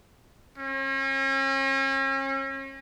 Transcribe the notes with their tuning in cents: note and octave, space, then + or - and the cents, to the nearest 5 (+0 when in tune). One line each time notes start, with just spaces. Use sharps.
C#4 -40